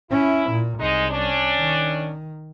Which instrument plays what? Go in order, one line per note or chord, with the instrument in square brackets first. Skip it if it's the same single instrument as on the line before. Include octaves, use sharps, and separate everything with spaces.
[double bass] C#4 [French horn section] E4
[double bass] A#2
[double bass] C2 [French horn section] G#3 D#4
[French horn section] C#4 D4
[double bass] D#3